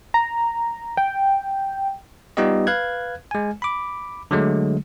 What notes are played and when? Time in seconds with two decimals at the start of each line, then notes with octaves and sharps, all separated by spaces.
0.14 A#5
0.97 G5
2.37 G3 B3 D#4 F4 G4 D#5
2.67 B4 F5 F#6 G#6
3.31 G#3 G#5
3.62 B5 D6
4.31 D3 F#3 G#3 A3